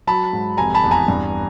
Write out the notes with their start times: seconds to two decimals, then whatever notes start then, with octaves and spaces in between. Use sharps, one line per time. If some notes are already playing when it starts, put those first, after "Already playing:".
0.07 F#3 A5 B5
0.33 G#2
0.57 F1 G#5 A#5
0.74 A5 B5
0.83 E2
0.91 G#5 A#5
1.08 G2